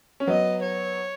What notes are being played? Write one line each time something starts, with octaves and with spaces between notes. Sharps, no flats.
C#4
F#3 B3 D#5
C#5